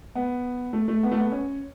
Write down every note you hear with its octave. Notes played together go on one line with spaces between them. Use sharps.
B3
A3
A3
B3
A3
B3
C#4